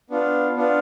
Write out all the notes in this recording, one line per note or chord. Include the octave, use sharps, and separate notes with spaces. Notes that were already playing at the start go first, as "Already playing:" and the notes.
B3 D4 F4
B3 D4 F4